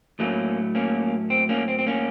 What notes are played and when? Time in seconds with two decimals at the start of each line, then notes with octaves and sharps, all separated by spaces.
0.19 A2 F#3 A3 A#3 C#4
0.75 A#3 C#4
1.30 C4
1.49 A#3 C#4
1.68 C4
1.79 C4
1.86 A#3 C#4